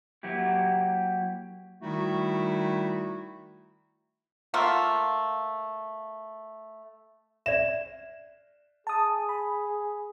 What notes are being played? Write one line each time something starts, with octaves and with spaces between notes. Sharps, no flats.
F#3 A#3 E4 G4
D#3 G3 A3 D#4 E4 F#4
A3 A#3 F4 F#5
D5 E5 E7
G#4 A5 D#6
B5